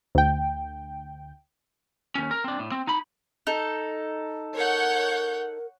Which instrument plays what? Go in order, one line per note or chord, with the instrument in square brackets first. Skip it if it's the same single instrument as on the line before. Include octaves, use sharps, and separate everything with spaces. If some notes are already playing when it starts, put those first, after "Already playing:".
[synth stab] D2 G5
[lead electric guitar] D#2 C#4
A#4
C4 D4
A2
C4
D#4 B5
[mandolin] D#4 A4
[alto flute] A#4 [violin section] C#5 F#5 G6